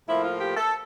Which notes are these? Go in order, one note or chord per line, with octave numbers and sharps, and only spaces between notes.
A2 F3 A#3 E4
F4
G4
A4